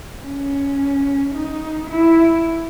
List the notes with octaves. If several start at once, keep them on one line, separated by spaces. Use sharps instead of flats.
C#4
D#4
E4